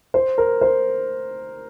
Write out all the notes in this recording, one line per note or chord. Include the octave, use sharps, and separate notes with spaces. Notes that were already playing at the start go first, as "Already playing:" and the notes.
C5
A#4
C5